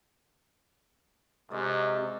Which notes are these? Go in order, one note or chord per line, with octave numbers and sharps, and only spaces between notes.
F#2 C3 G#3 D5 D#5